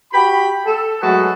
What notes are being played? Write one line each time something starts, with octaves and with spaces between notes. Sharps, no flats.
F#4 G4 G5 B5
A4
F#3 G#3 A3 F#4 G#4 B4